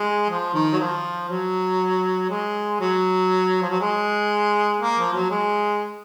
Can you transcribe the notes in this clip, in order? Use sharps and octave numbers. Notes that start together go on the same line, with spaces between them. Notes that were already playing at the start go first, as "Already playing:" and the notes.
Already playing: G#3
F3
D#3
F#3
F3
F#3
G#3
F#3
F3
F#3
G#3
A#3
F3
F#3
G#3